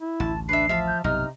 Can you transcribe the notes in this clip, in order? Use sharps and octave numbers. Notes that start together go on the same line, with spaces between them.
E4
A1 D2 A5
D4 B4 E5 C7
F3 E5 F5 A5
G6
B1 G2 C3 D#4 F6